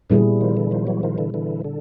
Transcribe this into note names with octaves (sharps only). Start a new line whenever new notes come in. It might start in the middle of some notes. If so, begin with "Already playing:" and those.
A#2 D3 E3 G3 B3 E4 G#4
D#3 F3
D3 E3
D#3 F3
E3 F#3
D#3 F3
D3 E3
D3 E3
D3